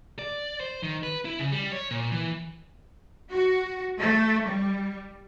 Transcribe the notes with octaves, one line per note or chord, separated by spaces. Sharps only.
D5
C5
D#3
B4
E4
C#3
G3
C#5
A#2
E3
F#4
A3
G3